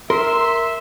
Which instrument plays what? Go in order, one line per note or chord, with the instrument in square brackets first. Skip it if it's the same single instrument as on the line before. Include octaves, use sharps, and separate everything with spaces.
[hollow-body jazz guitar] A#4 [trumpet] E5 [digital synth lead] C6